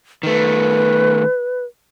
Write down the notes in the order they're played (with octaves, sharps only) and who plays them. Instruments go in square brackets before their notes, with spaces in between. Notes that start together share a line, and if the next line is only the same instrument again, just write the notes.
[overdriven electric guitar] D#3 A3 [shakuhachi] B4